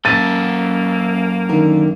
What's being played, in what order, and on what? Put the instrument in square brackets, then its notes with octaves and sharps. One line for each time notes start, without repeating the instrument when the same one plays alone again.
[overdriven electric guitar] F#2 A4 [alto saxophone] A#3 [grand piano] A6 D#7
[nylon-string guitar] D3 D#3 A#4